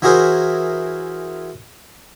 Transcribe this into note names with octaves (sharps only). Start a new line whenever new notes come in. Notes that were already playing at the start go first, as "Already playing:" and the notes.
E3 E4 F#4 G#4 A#4 C5